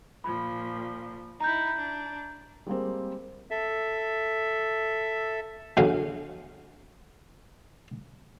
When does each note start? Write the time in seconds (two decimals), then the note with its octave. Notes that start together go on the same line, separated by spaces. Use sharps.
0.24 A#2 F3 B5
1.40 D#4 E4 A#5 G6
1.75 D4
2.67 G3 G#3 A#3 C4
3.51 A4 E5
5.77 A#1 D3 C#4 F#4 F5